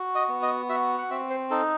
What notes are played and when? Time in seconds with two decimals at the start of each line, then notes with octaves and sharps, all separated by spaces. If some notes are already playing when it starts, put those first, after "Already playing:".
Already playing: F#4
0.15 D#5
0.28 B3
0.42 D#5
0.69 F#4 E5
0.99 F#5
1.10 C4 E5
1.30 C5
1.51 D#4 A4